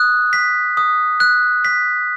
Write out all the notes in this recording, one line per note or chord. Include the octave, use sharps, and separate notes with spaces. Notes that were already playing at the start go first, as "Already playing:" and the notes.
Already playing: D#6 F#6
B6
D#6
F#6
B6